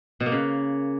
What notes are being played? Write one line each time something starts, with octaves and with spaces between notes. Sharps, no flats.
B2
A#3
C#3